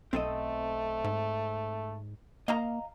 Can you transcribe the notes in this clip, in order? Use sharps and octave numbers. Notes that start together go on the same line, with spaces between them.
B1 A3 C4 A4 D#5
G#2
A#3 D#5 F5 A#5